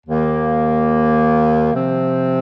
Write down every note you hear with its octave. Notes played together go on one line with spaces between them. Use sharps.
D#2 D#3 A#3
C3 F3 C4